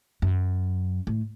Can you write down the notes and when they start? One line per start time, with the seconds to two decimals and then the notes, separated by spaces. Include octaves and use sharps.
0.22 F#2
1.07 A2